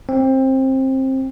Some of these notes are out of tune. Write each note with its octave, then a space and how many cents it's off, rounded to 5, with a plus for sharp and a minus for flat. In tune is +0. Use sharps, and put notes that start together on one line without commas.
C4 +20